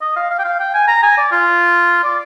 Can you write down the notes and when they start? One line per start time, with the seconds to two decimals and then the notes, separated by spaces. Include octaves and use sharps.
0.02 D#5
0.16 F5
0.31 F5
0.39 G5
0.45 F5
0.60 G5
0.74 G#5
0.88 A#5
1.03 G#5
1.17 D5
1.31 F4
2.04 D5